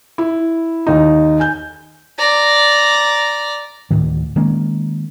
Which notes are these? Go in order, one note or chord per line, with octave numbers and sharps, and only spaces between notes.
E4
D#2 D#4
G#5 G6
D5 A#5
D2 A2 D#3
D#3 G#3 A#3 C#4